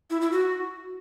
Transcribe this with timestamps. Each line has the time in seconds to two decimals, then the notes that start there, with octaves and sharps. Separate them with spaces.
0.10 E4
0.21 E4
0.32 F#4